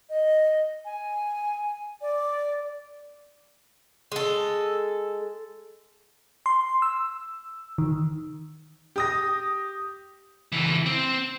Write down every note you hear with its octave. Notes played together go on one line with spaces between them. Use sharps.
D#5
G#5
D5
G#3 A4
C6
E6
D#3
G4 D#6 A#6
C#2 E3
C4